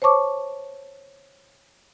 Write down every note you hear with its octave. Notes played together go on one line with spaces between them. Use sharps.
C5 C#5 A5 C#6 D6